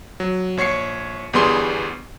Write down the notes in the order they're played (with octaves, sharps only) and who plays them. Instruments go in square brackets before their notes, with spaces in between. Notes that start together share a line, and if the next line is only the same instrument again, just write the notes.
[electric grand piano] F#3
A#1 C#5 C#6 C7 C#7
G1 E2 G3 B3 G#4 C6